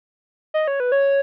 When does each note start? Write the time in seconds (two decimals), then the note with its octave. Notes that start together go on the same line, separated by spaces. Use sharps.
0.54 D#5
0.68 C#5
0.80 B4
0.92 C#5